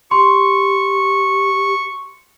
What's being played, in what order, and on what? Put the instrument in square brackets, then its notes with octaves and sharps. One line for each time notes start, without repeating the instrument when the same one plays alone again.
[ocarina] G4 [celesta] C6 [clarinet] C#6